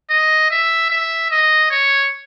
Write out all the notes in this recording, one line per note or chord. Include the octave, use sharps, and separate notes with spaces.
D#5
E5
E5
D#5
C#5